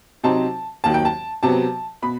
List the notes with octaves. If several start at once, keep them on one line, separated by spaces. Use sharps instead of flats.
C3 F#3 C4 D#4 A5
D#2 D#3 F#3 A5
G5
A5
C3 F#3 B3 A5
B2 B5